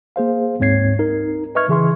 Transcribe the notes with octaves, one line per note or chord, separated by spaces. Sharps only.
A#3 G#4 C5 F5
D2 G#2 C4 C#5 G#6 C7
D#4 A#4
B4 D#5 E5 C#6 F6 G#6
C#3 E3 G#4 E5 C6 C#6